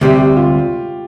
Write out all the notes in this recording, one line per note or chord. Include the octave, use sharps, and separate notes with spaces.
D2 C3 G3 G4
G4
F4